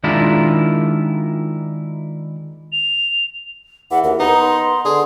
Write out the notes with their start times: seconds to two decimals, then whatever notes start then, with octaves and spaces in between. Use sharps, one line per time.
0.04 D#3 G#3 D4 E4 F4 A#4
2.72 F7
3.91 E2 E3 F#5
4.04 D#2 A#4
4.20 B3 D#4
4.39 C6
4.85 D3 G#4 C6